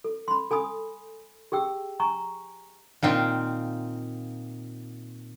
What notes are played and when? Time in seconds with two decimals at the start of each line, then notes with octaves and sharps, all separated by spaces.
0.04 A4
0.28 B5 C6
0.51 A4 G#5 B5 D#6
1.52 G4 G#4 G5 E6
2.00 G#5 A#5 C#6
3.03 A#2 D#3 C4 F4